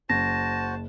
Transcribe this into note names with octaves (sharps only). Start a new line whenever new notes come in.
F#1 F#4 C5 A5 A#6